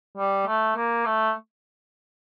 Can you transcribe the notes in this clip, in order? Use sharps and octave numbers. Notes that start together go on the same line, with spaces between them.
G3
A3
A#3
A3